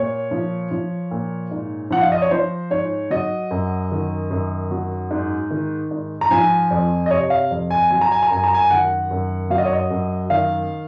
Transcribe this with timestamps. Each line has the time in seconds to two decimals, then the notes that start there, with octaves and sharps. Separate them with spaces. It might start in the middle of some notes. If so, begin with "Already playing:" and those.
Already playing: A#2 C#5
0.31 F3
0.71 F3
1.11 A#2
1.51 G#2
1.91 F3 F#5
2.02 F5
2.12 D#5
2.22 C#5
2.31 F3 C5
2.70 G#2 C#5
3.10 F#3 D#5
3.51 F#2
3.91 D#3
4.31 F#2
4.71 F#3
5.11 G#2
5.51 D#3
5.91 G#2
6.21 A#5
6.31 F3 G#5
6.71 F2
7.06 D#5
7.11 C3 C#5
7.30 F5
7.51 F2
7.71 G#5
7.91 F#3 G#5
8.01 A#5
8.12 G#5
8.23 A#5
8.31 F#2 G#5
8.44 A#5
8.54 G#5
8.71 D#3 F#5
9.11 F#2
9.50 F#3 F5
9.58 D#5
9.65 C#5
9.73 D#5
9.90 F#2
10.30 D#3 F5